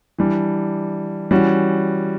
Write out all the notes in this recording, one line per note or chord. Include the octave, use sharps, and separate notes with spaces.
E3 G3 D4
E3 G3 C#4 F#4